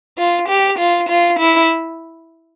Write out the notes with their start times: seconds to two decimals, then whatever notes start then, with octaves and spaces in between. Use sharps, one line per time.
0.18 F4
0.48 G4
0.79 F4
1.09 F4
1.39 E4